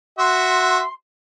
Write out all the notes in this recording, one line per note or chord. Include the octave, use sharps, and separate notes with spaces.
F#4 E5 C6